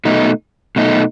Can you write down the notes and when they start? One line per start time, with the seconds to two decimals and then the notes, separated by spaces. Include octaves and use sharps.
0.05 B2 A3 D#4
0.76 B2 A3 D#4